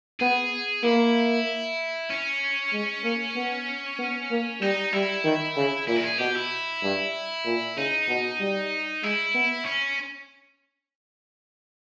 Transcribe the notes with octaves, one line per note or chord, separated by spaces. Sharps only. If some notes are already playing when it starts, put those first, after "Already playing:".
B3 G#4
A#3 E4
C#4
G#3
A#3
B3
B3
A#3
G3 D#4
G3 E4
D#3
C#3
A#2 E4
A#4
G#4
B2 G4
E4
G2
A#2
C#3 D#4
B2
G3
G#3 E4
B3
C#4